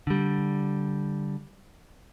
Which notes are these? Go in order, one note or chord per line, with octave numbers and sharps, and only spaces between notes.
D3 G3